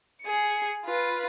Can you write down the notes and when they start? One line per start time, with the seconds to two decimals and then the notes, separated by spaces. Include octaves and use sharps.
0.23 G#4 C#7
0.86 F4 B4